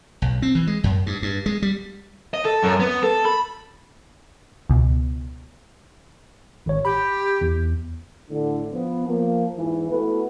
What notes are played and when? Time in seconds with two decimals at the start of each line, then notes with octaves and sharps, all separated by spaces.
0.22 B1
0.42 C4
0.55 E3
0.67 G#3
0.84 F#2
1.06 G2
1.22 G2
1.46 G#3
1.62 G3
2.34 D#5
2.45 A4
2.63 F#2
2.80 B3
3.03 A4
3.25 B5
4.69 C#2 B2
6.66 G#1 C#5
6.85 G4 B5
7.41 E2
8.30 A2 D3
8.72 F3 B3
9.08 F3 A#3
9.57 E2 G#2 E3
9.89 A3 B3 E4 F#4 B4